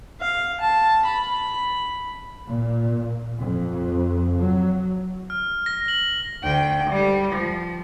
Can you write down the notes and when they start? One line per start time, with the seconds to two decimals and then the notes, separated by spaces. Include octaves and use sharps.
0.21 F5
0.61 A5
1.06 B5
2.46 A#2
3.40 F2
4.39 F#3
5.30 F6
5.66 A#6
5.88 F#7
6.43 D2 G5
6.90 G3
7.33 F3